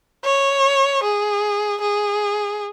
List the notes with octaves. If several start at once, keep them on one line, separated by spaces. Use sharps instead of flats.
C#5
G#4
G#4